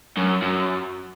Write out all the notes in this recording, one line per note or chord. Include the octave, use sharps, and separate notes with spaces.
F#2
F#2